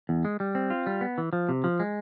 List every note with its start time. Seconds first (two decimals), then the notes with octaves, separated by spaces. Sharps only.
0.09 E2
0.25 G#3
0.40 G3
0.55 C4
0.70 F4
0.86 G3
1.01 B3
1.18 E3
1.33 F3
1.49 C3
1.64 F3
1.80 G#3